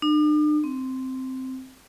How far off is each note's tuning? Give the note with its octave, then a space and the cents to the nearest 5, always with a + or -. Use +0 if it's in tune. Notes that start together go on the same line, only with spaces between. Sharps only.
D4 +45
C4 -5